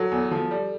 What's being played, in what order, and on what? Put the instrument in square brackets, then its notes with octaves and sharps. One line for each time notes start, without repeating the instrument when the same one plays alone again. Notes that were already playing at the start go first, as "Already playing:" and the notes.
Already playing: [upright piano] F#3 [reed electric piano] A4
[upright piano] E2
F3
G3